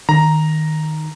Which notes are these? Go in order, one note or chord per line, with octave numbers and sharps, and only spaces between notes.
D#3 A#5